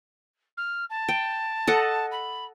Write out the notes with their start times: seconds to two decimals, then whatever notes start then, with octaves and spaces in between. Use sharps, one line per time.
0.57 F6
0.90 A5
1.08 G5
1.67 A4 D#5 F#5
2.11 B5